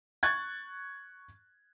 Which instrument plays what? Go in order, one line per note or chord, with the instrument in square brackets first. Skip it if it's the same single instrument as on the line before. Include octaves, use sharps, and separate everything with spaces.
[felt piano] C#6 F#6 G#6 A6